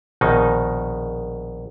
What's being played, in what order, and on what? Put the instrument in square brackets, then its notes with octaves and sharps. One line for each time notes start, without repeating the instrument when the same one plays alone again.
[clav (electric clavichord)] A#1 B2 D#3 D#4